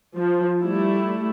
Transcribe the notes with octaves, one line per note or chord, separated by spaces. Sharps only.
F3
G3 A3 E4